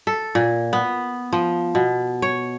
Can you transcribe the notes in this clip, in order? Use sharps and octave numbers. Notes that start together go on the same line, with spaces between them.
A4
A#2
B3
F3
B2
C#5